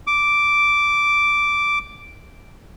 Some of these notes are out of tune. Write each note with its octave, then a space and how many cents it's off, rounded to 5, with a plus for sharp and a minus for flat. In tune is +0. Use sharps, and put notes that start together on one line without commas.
D6 -5